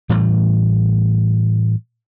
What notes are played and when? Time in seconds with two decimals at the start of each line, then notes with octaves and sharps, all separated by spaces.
0.09 A2 E3 G3 A3